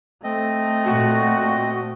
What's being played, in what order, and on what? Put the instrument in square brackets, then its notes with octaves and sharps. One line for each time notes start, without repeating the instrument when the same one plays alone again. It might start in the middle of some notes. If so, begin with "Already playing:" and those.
[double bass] A3 [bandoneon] C4 D#5
[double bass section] A#2 [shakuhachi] F#4